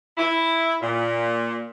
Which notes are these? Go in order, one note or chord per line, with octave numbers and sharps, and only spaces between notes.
E4
A#2